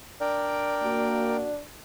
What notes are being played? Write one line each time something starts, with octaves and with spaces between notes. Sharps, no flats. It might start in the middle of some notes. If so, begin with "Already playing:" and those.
D4 A#4 D5 G5
A#3 F#4